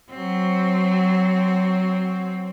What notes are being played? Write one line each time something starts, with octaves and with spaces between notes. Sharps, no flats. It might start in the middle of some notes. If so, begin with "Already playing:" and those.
F#3 C4